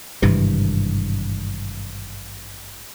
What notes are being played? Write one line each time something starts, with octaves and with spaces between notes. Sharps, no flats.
G#1 G2 C3 E3